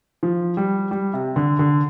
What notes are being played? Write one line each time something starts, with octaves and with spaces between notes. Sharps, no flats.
F3
G3
G3
C3
D3
D3